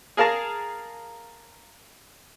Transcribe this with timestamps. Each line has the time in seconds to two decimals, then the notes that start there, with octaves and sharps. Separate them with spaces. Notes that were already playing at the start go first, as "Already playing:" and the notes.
0.17 G#4 A#4 F5 A5 A#5